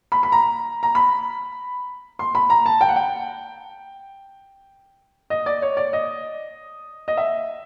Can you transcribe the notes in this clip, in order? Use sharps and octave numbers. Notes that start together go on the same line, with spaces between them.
B5
B5
A#5
A#5
B5
C6
B5
A#5
A5
G5
F#5
G5
D#5
D5
C#5
D5
D#5
D#5
E5